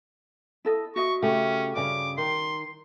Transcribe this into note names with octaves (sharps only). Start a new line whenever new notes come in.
E4 A4 D#5
F#4 D#5 E5 C#6
C#3 A3 C#4 G4
G2 C#3 D6
D#3 C6